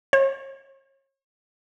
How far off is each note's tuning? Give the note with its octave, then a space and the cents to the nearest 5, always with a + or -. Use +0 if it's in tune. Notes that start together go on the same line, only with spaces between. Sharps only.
C#5 -40